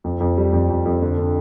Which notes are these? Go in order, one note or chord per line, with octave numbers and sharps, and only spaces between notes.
F2
F2
G3
F2
F2
F2
D3
D3